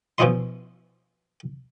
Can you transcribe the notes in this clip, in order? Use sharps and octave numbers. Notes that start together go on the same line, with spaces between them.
B2 F3 C#4 E4 D#5 C6